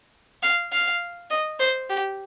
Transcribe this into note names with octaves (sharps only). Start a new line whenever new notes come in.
F5
F5
D#5
C5
G4